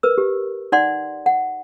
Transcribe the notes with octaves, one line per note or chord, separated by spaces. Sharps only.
A#4 B4 E6
G4
D#4 D5 F#5 C6
F#5